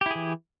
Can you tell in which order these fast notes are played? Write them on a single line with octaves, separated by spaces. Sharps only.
G4 E4 G#4 E3